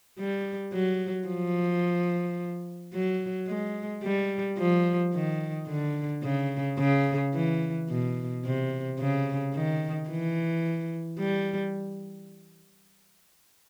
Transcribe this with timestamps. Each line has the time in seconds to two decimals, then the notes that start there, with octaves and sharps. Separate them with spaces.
0.19 G3
0.73 F#3
1.28 F3
2.94 F#3
3.48 G#3
4.04 G3
4.58 F3
5.14 D#3
5.68 D3
6.23 C#3
6.78 C#3
7.34 E3
7.90 B2
8.45 C3
9.00 C#3
9.54 D#3
10.09 E3
11.19 G3